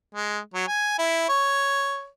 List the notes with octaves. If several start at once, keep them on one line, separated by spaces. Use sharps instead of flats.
G#3
F#3
G#5
E4
C#5